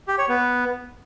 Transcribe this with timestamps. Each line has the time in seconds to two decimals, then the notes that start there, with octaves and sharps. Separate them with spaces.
0.08 G4
0.18 C#5
0.29 B3